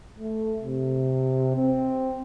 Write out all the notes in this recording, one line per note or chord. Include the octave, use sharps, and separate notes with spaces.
A3
C3
C4